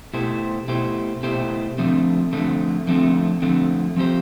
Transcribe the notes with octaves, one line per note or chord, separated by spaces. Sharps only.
B2 A3 E4 G4 C5
B2 A3 E4 G4 C5
B2 A3 E4 G4 C5
D3 F3 A3 C4
D3 F3 A3 C4
D3 F3 A3 C4
D3 F3 A3 C4
F3 C4 G4 C5